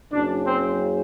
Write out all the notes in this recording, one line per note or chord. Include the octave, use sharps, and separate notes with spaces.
F#1 F#2 C#3 D4
C4